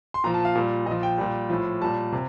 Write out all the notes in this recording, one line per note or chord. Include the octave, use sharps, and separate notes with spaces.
C6
A#2 F3 A#5
A5
F5
A#2 G3
A#2 F3 D#5
G5
A#2 G3
A2 F3
A#2 G3 A5
C3